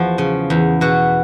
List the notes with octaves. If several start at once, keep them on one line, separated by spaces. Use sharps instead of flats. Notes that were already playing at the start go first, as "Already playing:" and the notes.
Already playing: E2 F3 F#4
C#3
E2
B2 F#4